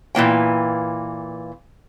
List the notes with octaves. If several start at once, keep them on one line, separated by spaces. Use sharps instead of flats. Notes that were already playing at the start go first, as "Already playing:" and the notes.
A#2 E3 A#3 G5